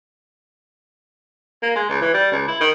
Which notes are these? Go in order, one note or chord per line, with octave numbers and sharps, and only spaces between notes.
A#3
G#3
C#2
E3
G3
C#2
E4
D#3